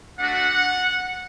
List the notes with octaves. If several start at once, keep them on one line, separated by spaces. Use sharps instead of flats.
A3 D4 F#4 F#5